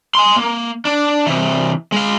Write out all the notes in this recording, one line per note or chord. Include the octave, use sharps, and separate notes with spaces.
G#5 C6
A#3
D4
C3 E3
G#3 F5